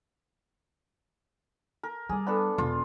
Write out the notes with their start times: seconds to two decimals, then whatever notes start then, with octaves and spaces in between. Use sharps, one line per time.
1.83 A#4
2.09 G3 G#4 D5
2.27 B3 D4 A4
2.58 E1 F4